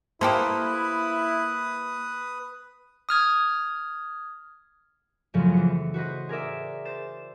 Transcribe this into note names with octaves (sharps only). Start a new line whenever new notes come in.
A#3 E4 G4 A4 B4 C5 D#6
D#6 F6 G#6
F#2 A2 C#3 F3 F#3
E3 C#7
F#4 B4 C5 D#5
G#4 A#4 D5 E5
C5 A6 E7